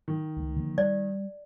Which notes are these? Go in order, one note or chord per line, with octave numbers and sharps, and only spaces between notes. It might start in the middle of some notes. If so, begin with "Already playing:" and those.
D#3
C#2 A3
D3 F3 A#3
G3 D5